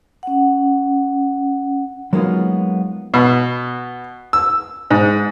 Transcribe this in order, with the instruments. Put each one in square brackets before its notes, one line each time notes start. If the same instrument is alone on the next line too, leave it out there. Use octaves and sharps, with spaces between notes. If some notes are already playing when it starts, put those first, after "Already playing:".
[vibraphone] C#4 F#5
[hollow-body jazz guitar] F#3 G#3 A#3 B3 D#4 F4
[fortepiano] B2
E6
G#2